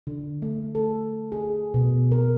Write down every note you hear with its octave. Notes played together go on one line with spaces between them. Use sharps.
D3
A3
A4
G#4
B2
A#4